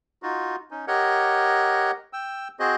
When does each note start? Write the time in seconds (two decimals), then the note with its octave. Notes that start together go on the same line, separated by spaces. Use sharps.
0.23 D#4 F4 F#4
0.71 C#4 D#4
0.88 G4 A#4 C#5 D#5 F#5
2.13 G5 E6
2.60 C4 F#4 G#4 C5 D#5